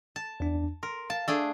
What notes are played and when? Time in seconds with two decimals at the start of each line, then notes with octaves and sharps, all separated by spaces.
0.16 A5
0.40 E2 D4
0.83 A#4 C6
1.10 F5 A5
1.28 A3 D4 G#4